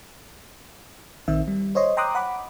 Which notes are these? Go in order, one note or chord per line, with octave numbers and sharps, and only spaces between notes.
A#1 D#3 C4 E5
G3
C5 C#5 D#5 C6
G5 A#5 C6 D6 D#6 F#6
F#5 B5 D6